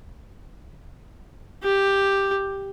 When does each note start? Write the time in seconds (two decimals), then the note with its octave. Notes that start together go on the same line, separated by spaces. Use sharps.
1.64 G4